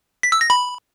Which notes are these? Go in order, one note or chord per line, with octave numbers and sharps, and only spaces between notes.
B6
E6
A#6
B5